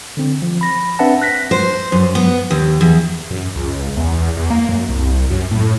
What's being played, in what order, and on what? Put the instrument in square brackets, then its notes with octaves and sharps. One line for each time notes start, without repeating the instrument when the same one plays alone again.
[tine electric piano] D3 C4
F3
B5 A#6
C4 D4 B4 E5 F#5 A5
F#6 A#6 B6
[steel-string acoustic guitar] C5
F#2
B3
D#2
E2
[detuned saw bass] F#2
C#2
E2
E2
A#3
F#2
C2
F#2
A2